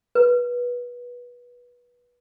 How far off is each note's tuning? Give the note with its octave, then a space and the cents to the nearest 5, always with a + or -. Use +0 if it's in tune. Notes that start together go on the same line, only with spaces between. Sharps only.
B4 -20